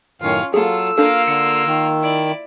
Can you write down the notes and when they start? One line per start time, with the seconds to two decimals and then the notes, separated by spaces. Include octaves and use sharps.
0.22 F#2 A2 D#3 C#4 F4 F5
0.54 F#3 A#3 F4 G#4 A4 E6
0.98 A#3 D4 F4 A4 F5
1.28 D3 C#7
1.67 D#3
2.01 E4 D5